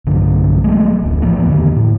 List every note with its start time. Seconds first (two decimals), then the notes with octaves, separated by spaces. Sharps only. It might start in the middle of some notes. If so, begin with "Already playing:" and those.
0.06 B1 G2 D3
0.64 F#3 G#3 A3
1.03 D1 A1
1.22 E3 F3 A#3
1.46 E2 D3 D#3
1.76 A2